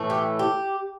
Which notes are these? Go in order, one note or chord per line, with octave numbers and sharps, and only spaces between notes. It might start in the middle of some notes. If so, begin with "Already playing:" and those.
Already playing: A2 E3 A3
G4
G4